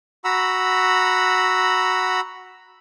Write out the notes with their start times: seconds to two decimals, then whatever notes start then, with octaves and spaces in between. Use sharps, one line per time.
0.25 F#4 F#5 A#5 B5 E6